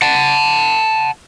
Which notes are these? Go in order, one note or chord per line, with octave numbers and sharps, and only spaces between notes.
F#5 A5